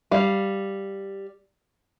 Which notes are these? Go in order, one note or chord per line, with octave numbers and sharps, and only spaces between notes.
G3 F5